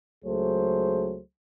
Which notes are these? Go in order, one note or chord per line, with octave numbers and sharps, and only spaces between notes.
C#2 F#3 A3 G#4 C5